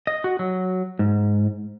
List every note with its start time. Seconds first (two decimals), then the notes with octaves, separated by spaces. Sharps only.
0.07 D#5
0.24 F#4
0.39 F#3
0.99 G#2